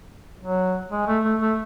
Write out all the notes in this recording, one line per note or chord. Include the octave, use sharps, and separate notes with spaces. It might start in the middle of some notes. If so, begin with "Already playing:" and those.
F#3
G#3
A3
A3
A3